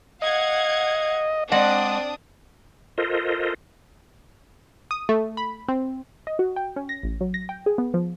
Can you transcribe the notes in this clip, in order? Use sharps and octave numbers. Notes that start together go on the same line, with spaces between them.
D#5 F5 F#5 G#6
G#3 C4 D4 D5 D#5 F#5 D#6
F4 A4 A#4 C5 D#5
D#6
A3
B5
C4
D#5
F#4
G5
C#4
A#6
A1
F#3
A#6
G5
G#4
B3
F3